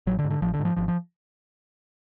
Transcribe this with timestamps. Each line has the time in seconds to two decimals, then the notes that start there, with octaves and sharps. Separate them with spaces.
0.07 A1 F#3
0.19 D3
0.24 G#2
0.30 D3
0.42 A1 F3
0.54 D3
0.59 G#2
0.65 F3
0.76 G#1 F3
0.88 F3